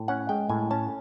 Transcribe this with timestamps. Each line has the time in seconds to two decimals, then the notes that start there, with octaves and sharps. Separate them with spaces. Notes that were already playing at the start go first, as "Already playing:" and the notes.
Already playing: A2
0.08 C#4 F#5
0.29 G#3 G5
0.49 A2 G#5
0.71 C#4 A5